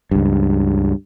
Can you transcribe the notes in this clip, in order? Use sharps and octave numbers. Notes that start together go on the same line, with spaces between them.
C#2 G2